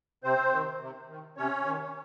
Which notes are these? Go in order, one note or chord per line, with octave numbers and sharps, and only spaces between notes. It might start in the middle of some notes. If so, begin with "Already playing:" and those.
C3 C4 C5
D#3
C3
D#3
C3 C#4 C#5
D#3